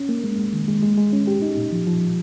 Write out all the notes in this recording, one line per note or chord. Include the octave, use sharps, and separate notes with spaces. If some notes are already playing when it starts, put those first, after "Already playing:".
Already playing: C#4
A#3
G#3
G#3
D#3
G#3
G#3
G#3
C#4
G4
D#4
A#2
F3
F3